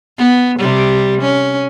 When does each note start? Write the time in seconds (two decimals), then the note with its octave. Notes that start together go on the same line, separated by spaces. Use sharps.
0.18 B3
0.58 C3 G3
1.21 C#4